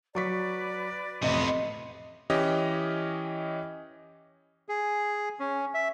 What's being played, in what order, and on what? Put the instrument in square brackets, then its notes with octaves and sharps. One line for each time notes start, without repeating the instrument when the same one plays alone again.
[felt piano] F#3 C#6 B6 [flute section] B4 D5
[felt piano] A1 F2 [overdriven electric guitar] C3 B3 [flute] D#5
[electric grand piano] E3 C#4 G4 D#5
[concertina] G#4
C#4
E5